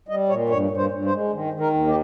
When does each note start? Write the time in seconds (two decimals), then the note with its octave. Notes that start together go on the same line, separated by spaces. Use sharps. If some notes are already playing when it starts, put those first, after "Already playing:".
0.08 G3 D#5
0.29 A#2 C#5
0.49 G2 C#5
0.70 G2
0.77 C5
0.91 G2
1.05 C5
1.12 G#3
1.32 D#3
1.53 D#3
1.60 A#4
1.73 D#2
1.87 G4